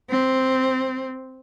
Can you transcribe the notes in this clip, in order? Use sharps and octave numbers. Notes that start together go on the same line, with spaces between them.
C4